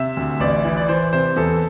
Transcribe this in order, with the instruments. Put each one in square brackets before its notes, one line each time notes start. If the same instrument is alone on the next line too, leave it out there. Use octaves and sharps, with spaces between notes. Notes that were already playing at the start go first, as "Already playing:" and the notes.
Already playing: [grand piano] C3 E5
D2
A1 D5
E3
D5
E3 C5
C3 C5
E2 A4